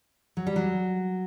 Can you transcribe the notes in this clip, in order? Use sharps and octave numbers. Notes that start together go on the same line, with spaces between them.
F#3
G3
F#3